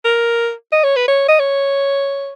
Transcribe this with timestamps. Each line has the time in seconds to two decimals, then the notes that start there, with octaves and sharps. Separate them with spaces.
0.04 A#4
0.72 D#5
0.83 C#5
0.96 B4
1.08 C#5
1.28 D#5
1.39 C#5